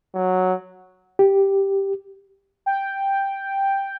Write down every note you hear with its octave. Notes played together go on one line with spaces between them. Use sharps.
F#3
G4
G5